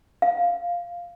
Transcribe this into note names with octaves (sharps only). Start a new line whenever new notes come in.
F5